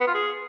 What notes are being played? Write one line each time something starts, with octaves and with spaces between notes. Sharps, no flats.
B3
F4
G#4